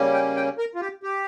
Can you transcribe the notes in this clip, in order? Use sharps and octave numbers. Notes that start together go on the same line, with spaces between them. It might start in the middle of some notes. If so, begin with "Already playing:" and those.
Already playing: C#3 G3 A#3 C#4
G5
G5
A#4
F4
G4
G4